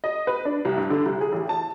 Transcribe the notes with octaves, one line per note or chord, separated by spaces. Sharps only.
D#5
B4
D4
C2
G2
D3
C2
G#4
A1
A5